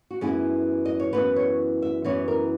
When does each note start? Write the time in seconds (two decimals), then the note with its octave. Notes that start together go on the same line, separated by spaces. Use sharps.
0.11 F#4
0.21 F#2 E3 B3 E4 G#4
0.86 D#5
1.00 C#5
1.13 F#2 E3 B3 E4 B4
1.36 C#5
1.82 E5
2.05 F#2 E3 B3 E4 C#5
2.28 A#4